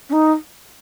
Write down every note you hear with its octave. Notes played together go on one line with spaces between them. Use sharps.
C#4
D#4